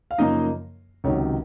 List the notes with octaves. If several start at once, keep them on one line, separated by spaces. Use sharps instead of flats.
F5
F#2 C#3 F3 A#3 D#4 D#5
C#2 C3 D#3 F#3 C#5